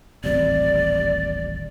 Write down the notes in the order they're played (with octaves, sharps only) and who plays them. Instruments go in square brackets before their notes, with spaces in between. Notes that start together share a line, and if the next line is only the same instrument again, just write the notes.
[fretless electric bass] D#1 A1 C3 [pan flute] D5